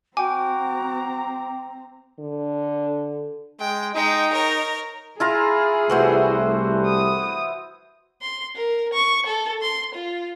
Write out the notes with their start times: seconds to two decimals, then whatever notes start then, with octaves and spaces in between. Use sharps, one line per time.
0.17 C4 F#4 G5 G#5 A#5 D6
2.19 D3
3.60 G#3 G5
3.95 G#3 D#4 G5
4.33 A#4 C#5
5.20 E4 F4 G#4 A#5
5.90 C2 E3 G3 A3 F#4 C5
6.87 D#6
8.22 C6
8.55 A#4
8.93 C#6
9.26 A4
9.62 C6
9.95 F4